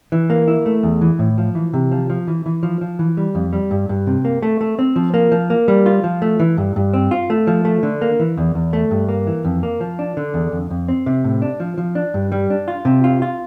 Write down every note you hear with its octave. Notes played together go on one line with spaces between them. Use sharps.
E3
A#3
E4
A3
E2
E3
A2
F3
E3
C3
F3
F3
E3
E3
F3
F3
E3
G3
F2
G3
G2
G2
C3
A#3
A3
A3
C4
F3
A#3
F3
A#3
G3
F4
F3
A3
E3
G2
G2
C4
F4
A3
F3
A3
D3
A#3
E3
E2
E2
A3
G2
A#3
E3
F2
A#3
F3
D4
D3
E2
F2
F2
C4
C3
A2
D4
F3
F3
D4
G2
G3
D4
F4
C3
F4
F4